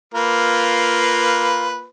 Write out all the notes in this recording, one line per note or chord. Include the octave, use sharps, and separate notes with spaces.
A#3 F4 B4